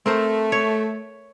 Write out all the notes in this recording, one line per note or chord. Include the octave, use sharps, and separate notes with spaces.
A3 C4 A#4 C5
C#5